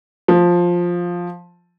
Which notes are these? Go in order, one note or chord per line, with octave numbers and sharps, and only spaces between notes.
F3